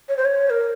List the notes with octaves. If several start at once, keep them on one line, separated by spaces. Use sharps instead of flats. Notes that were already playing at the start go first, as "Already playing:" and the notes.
C#5
C5
C#5
A#4